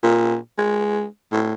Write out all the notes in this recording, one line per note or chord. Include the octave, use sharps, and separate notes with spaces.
A#2
G#3
A2